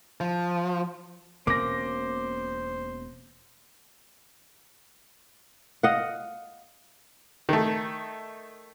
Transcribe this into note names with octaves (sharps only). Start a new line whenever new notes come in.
F3
E1 B2 A#3 C4 C#4 C5 D6 A#6
D#5 F5 F#5
D#3 A3